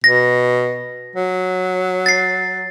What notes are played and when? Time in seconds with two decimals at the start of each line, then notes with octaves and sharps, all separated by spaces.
0.04 B2 A#6
1.16 F#3
2.06 A6 C7